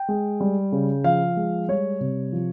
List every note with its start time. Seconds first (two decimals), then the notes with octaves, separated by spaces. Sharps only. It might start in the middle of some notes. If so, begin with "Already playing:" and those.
Already playing: G5
0.08 G#3
0.40 G3
0.72 C#3
1.04 F3 F5
1.37 G#3
1.68 G3 C#5
2.01 C3
2.33 F3